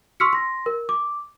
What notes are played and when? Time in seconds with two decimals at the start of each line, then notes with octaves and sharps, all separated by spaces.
0.20 C6 C#6 E6 F6 B6 C#7
0.33 C6 A#6
0.66 A#4
0.89 D6